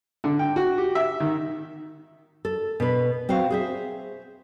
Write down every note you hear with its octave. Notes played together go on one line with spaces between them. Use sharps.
D3
G5
F#4
G4
E5
D#3
A4
B2 B4
C4 F#4 C5 F5
G#4 C5 E5